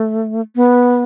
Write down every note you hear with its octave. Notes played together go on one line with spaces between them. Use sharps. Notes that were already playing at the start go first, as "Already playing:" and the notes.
Already playing: A3
B3